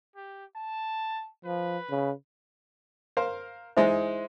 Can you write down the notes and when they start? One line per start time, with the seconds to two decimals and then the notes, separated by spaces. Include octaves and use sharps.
0.16 G4
0.56 A5
1.45 F3 B4
1.90 C#3
3.17 A#4 C5 F5
3.77 E3 G#3 D#4 C5 E5